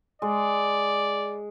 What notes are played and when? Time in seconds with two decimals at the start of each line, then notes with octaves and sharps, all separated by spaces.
0.22 G#3 D5